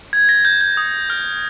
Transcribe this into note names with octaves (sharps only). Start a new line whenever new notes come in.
G#6
A#6
G6
G6
D#6
F6